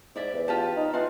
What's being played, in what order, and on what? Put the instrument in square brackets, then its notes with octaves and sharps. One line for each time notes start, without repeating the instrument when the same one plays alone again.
[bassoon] G#2 [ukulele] E4 D5 E5
[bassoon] E2
[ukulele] F4 G4 A5
[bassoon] D#4
[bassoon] E3 [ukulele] F4 F#4 C5